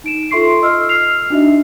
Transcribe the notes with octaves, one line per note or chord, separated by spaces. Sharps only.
D#4 D7 E7
F4 A4 E5 C6 C#6 C7
D#5 E6 F6
F6 C7 F7
D4 D#4 F#4 D#5 E5